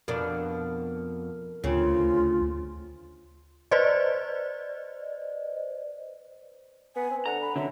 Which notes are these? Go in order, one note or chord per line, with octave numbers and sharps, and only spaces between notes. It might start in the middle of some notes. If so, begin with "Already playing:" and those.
F2 B2 D4 A#4
D2 C#3 C4 F4
B4 C5 D5 D#5
B3 G#5
C4
D3 F#5 A#5
B5
D3 F#3 E5